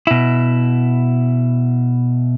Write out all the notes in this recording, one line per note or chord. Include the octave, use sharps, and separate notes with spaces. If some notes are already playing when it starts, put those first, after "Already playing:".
B2 E4